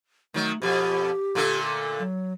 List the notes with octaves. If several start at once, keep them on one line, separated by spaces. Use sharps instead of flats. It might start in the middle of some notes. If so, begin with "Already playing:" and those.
D#3 F#3 A3
F2 B2 G4
A#2 D3 A3
F#3